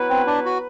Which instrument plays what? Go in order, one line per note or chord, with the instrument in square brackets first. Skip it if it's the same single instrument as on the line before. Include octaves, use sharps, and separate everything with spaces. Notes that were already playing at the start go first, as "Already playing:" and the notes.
Already playing: [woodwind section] F#3 B3 E4 B4
[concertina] C4
D4
F#4